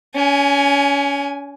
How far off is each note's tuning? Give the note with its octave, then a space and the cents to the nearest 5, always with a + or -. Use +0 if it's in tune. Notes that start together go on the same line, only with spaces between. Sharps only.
C#4 +30 G#5 +0